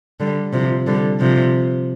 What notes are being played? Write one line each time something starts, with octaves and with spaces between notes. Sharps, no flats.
D3 G3
C3 F3
D3 G3
C3 F3